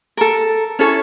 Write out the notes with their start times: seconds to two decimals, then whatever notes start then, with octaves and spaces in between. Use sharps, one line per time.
0.17 A4 A#4
0.79 C#4 E4 A4 C#5